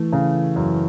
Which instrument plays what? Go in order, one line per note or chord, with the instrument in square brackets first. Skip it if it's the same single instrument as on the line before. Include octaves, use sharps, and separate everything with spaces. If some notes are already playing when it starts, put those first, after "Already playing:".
Already playing: [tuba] E3 [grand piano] A3
[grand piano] C#3
F#2